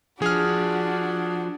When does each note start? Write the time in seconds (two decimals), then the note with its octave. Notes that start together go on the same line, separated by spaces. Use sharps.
0.22 F3 D4 F#4 G#4 F6